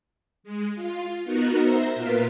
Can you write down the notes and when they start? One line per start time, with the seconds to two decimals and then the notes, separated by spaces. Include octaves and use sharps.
0.43 G#3
0.75 F4
1.24 B3 D#4 F#4 A#4
1.61 C5 E5 A#5
1.95 A#2 F4 A#4 B4 B5